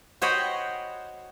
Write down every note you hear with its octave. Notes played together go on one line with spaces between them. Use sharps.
F#4 C5 C#5 D#5 G5 B5